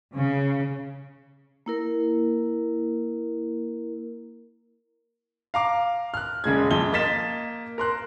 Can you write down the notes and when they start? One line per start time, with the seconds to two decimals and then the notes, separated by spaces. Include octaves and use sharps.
0.15 C#3
1.66 A#3 E4 A#4
5.54 F5 A#5 D6
6.14 F6 F#6
6.44 E1 C#3 G#3 G#6
6.71 F2 G7
6.93 A#3 D#5 A6 B6 E7
7.78 A#4 C6 F#6